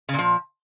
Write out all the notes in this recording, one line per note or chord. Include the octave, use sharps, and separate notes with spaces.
A#2 C#3 F3